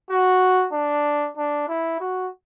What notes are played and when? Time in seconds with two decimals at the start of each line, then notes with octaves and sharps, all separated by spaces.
0.11 F#4
0.73 D4
1.37 D4
1.68 E4
2.00 F#4